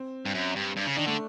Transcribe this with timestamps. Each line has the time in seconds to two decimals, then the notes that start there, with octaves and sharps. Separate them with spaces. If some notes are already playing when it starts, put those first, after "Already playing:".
Already playing: C4
0.25 G2
0.34 F#2
0.55 G2
0.76 G2
0.86 C#3
0.96 D#3 D4
1.07 D3 A3